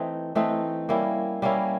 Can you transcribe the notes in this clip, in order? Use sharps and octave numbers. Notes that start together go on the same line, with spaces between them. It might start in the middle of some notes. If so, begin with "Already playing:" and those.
Already playing: E3 A3 C4 D#4
E3 A3 C4 D#4
G3 A#3 C#4 E4
G3 A#3 C#4 E4